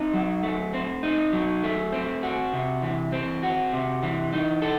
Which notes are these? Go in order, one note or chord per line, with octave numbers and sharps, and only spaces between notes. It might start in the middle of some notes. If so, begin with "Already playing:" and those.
Already playing: C4 D#4
F#3
A3
C4
D#4
F#3
A3
C4
F#4
C3
E3
C4
F#4
C3
E3
D#4
A4